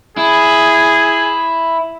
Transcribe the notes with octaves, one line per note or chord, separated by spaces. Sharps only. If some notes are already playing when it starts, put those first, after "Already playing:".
E4 G#4